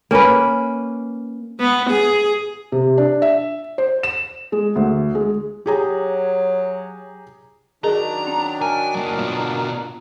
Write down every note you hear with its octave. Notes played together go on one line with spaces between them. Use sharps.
A#3 C#4 A#4 B4
B3
G#4
C3
D4
E5
C5
E7
G#3
D2
G#3
F#3 G4 G#4 A#5
D#3 F#3 D4 G#4 A#4 D#5 A#5
C#4
A#4 G#5
F#2 A#3
B2 F4